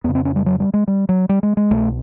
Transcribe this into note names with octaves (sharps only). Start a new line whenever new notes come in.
F2 C#3 B3
C4
C#4
G3
F#3
G3
G#3
G3
F#3
G3
G#3
G#3
C2 B2 A3